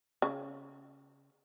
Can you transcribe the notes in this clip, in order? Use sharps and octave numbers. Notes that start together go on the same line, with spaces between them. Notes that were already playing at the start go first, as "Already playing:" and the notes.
C#3